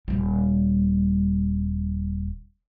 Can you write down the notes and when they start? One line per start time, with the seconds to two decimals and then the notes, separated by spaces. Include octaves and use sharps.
0.08 D#1 G3